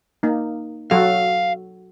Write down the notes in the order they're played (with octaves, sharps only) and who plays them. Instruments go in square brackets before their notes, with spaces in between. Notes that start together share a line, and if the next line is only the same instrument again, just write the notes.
[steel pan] A#3 D#4
[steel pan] F#3 F#4 A4 [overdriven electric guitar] F5